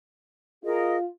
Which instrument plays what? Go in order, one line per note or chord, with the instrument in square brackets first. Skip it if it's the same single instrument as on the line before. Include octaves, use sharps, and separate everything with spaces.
[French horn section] F4 [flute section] G#4 A#4 D#5